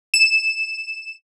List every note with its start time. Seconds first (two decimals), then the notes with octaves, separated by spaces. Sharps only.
0.14 E7